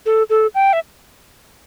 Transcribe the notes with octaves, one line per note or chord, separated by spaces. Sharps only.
A4
A4
G5
E5